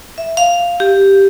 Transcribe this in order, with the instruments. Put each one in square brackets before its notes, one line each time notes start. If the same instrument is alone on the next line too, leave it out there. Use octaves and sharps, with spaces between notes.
[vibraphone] E5
F5
G4